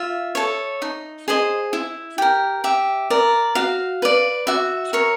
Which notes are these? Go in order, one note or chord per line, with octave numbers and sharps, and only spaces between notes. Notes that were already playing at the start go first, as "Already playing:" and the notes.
Already playing: F4 E5
A4 C#5
D#4
G#4 C5 D#5
E4
G4 A#4
G4 E5
A#4 D5
F#4 F5
B4 D5
F#4 E5
A#4 C#5